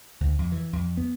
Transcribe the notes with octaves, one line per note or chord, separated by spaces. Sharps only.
D2
F2
E3
F2
B3